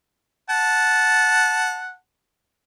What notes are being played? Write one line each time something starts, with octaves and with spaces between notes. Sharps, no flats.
F#5 A5